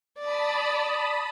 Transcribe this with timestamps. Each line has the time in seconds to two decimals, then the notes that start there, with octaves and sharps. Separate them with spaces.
0.19 D5 A5 B5 D#6